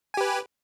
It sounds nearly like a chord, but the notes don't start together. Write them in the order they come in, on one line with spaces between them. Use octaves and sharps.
G#5 G4 B4